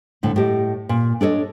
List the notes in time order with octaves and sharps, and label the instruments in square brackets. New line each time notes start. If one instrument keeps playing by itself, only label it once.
[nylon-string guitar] D2 A2 D3
A2 G4 D#5
A#2
D4 A4 C#5 D#5